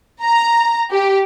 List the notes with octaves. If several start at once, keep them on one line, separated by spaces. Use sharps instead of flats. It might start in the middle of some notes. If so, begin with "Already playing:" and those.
A#5
G4